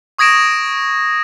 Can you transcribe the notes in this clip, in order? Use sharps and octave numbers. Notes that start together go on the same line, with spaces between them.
C#6 D#6 G#6 A#6 D7 E7